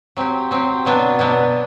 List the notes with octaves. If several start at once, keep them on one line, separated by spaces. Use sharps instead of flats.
F#3 C4 G4
F#3 C4 G4
B2 F#3 B3 D4
B2 F#3 B3 D4